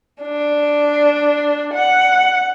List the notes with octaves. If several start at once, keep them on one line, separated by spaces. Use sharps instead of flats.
D4
F#5